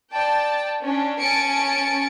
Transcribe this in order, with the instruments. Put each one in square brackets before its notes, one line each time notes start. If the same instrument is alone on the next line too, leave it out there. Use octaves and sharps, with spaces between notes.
[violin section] D5 G5 A5
C#4 D4
C#4 G#5 A5 A6 C#7 D7